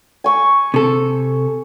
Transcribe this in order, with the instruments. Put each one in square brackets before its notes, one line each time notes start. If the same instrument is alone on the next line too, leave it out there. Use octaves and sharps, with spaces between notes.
[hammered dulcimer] G#5 C#6
[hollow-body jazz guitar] C3 A4